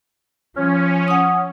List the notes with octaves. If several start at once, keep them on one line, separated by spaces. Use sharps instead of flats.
F3 C#4
F#5 D#6